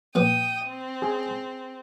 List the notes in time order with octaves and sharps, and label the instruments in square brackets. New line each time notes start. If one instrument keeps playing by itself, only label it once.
[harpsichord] A#1 B4 D6 [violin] G5 D#6
[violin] C4
[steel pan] G#4